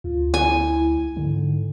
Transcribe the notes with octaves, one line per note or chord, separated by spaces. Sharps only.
D2 F4
E4 G#5
G#2 D3